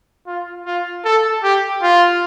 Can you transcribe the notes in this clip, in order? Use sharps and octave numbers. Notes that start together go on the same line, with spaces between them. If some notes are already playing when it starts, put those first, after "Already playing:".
F4
F4
A4
G4
F4